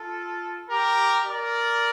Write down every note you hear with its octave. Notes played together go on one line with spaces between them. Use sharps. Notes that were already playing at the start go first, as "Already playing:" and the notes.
Already playing: F4 A4
G4 A#4
A#4 D5